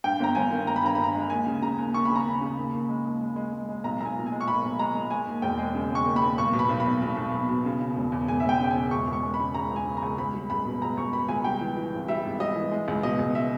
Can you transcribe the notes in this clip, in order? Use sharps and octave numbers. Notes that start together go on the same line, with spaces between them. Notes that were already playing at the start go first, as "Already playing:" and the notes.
G2 G5
G1 A#5
G1 G#5
D#3
G1 A#5
B5
G2 A#5
G2 B5
A#5
G#3
D#2 G#5
C#3
C#3 A#5
D#2
D#2 C#6
C#3 B5
A#5
C#3 B5
C#3
D#2
D#2
G#3
D#2
G#3
G#3
G#3
G#3
B1 A#5
B1 A#5
G#5
A#2
G#5
G#3
C#6
B1 B5
B1
G#3 A#5
G#3
G#3 G#5
D#2
E1 G5
G#3
C#3
G#3
C#6
D#2
B5
D#2
B1 C#6
B2
B5
B1
B5
B1
B1
B1
B1
B2
C#3
C#3
E1
E2
E1 G#5
E1 E5
G5
C#3 G5
E1 G#5
C#2 C#6
C#2
C#6
G#3
B5
C#3
C#2 A#5
C#2
G#5
C#3
A#5
C#2
C#2 B5
G3
C#2 B5
B2
C#2 A#5
C#2 C#6
B2 B5
C#2 G#5
G3 G5
E3
E3
G#1
G3 E5
G#1
G3 D#5
E3
G#3
C#2
B2 D#5
C#2
E5